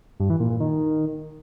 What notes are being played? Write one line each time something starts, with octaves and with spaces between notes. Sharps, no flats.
G2
E3
A#2
A#2
D#3